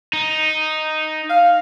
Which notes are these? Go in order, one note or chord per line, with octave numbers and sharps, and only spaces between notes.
D#4
F5